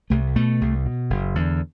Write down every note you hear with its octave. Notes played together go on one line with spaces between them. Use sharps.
C2 A3
B2 A3
C2
B2
F#1
E2 D3